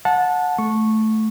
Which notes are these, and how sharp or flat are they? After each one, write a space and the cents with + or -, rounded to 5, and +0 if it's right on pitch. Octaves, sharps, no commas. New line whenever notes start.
F#5 -25 A5 -10
A3 -10 C#6 -10